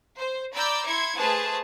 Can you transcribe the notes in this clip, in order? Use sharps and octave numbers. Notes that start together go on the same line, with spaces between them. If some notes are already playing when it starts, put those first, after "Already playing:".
C5
D5 A#5 B5 D6 E6 G6
E4 C6 G#6 C#7
A3 G#4 B4 C5 A5